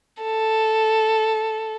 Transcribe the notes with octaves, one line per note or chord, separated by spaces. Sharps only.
A4